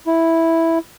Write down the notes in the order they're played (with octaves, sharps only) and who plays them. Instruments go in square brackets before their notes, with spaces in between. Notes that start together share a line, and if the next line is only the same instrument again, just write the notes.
[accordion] E4